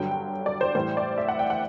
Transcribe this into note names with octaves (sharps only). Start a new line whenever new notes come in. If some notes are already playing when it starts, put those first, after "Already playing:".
Already playing: G2 D3 F#3 G5
G5
D5
C5
A2 E3 G3 C5
D5
E5
F#5
G5
F#5